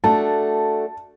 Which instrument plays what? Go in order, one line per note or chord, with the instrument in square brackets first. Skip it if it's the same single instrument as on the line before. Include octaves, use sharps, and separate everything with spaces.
[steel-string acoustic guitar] A3 D4 F#4 [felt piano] A5